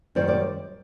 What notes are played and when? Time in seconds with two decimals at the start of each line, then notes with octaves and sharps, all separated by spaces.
0.15 F#2 D#3 G3 C5 D5
0.28 C5 D5